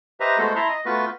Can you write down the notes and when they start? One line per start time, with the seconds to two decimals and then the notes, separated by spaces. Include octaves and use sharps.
0.20 G4 B4 C5 D#5 E5 A#5
0.38 G#3 A3 B3 F#4 A4 C5
0.56 E4 E5 A5 A#5 C6
0.69 D#5
0.86 A3 B3 F4 F#4 B4